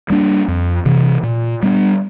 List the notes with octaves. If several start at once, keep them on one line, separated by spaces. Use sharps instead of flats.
G3 A#3 D4
F2
C3 E3
A#2
G3 B3 D4